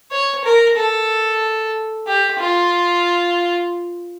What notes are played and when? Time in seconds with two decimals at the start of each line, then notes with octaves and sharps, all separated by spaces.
0.12 C#5
0.45 A#4
0.77 A4
2.07 G4
2.40 F4